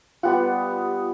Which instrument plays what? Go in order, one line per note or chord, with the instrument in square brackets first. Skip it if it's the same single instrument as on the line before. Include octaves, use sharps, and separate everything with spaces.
[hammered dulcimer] G3 B3 F#5 [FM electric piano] F4 G4